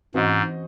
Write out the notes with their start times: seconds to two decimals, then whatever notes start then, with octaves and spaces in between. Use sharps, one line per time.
0.14 G#2 E3 C4 F#4 C5 D#5